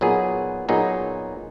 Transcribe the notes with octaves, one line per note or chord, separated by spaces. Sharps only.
A#2 F#3 B3 D#4 G#4
A#2 F#3 B3 D#4 G#4